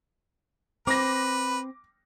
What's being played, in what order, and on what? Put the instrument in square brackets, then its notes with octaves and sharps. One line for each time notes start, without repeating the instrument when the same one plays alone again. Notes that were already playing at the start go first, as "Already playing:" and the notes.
[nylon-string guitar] C4 [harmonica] B4 [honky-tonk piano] D6 A#6